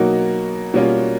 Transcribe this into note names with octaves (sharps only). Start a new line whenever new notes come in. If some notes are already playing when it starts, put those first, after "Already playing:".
Already playing: B2 F#3 A#3 D#4 F#4
B2 G3 A#3 C#4 F4